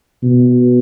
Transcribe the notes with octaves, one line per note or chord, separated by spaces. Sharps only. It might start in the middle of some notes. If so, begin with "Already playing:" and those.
B2